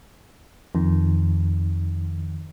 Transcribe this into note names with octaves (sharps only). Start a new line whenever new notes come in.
F2 D#3